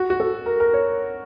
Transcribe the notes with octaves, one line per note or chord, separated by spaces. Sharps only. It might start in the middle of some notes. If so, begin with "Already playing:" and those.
Already playing: F#4
F#4
A4
A#4
A#4
C#5